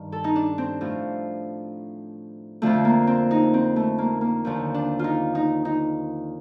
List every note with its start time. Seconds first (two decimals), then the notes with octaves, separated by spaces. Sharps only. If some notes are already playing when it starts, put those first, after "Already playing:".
Already playing: G2 D#3
0.12 A4
0.24 D#4
0.36 D4
0.58 C4
0.81 A2 F3
2.62 F2 D3 F3 A3
2.85 A#3
3.07 C4
3.31 D#4
3.54 C4
3.76 A3
3.98 A#3
4.21 A#3
4.45 D#2 D3 F3
4.74 D4
4.99 D#4 F4
5.35 D#4
5.65 D#4